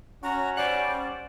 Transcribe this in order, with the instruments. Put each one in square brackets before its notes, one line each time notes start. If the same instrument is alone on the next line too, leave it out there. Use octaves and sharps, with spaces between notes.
[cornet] C#4 [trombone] F#4 [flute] A#5
[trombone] G3 [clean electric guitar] C5 F#5 [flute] D5